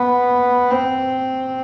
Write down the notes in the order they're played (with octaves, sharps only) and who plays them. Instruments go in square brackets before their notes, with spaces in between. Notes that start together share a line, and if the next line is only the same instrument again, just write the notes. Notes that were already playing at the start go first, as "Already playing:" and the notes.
Already playing: [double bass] B3
C4